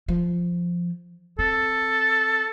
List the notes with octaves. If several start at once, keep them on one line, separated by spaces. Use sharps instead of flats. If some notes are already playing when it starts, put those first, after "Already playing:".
F3
C4 A4